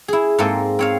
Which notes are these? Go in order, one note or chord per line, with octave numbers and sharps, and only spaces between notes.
E4 G#4
G#2 A#3 C4 A4 D#5
C4 C#5 F5